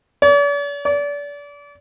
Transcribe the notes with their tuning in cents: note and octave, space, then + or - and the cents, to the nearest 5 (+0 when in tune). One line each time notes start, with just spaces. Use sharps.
D5 -45
D5 -30